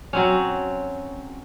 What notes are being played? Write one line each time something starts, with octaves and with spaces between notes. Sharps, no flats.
F#3 C4 C#4